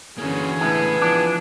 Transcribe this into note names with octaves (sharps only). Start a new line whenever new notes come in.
D3 E3 A#3 C#4 F#4 G#4
C#2 A2 B3 E4
F3 D4